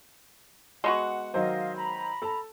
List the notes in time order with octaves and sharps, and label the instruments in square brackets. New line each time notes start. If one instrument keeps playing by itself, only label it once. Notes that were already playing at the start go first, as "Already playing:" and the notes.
[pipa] G#3 B3 F#4 [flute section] F#5
[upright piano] D#3 F#3 C5 [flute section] D#5 F5
[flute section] A#5 B5
[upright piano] A4 A5